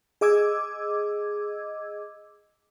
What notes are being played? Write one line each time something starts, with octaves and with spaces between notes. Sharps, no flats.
G#4 D#5 D6 E6 G#6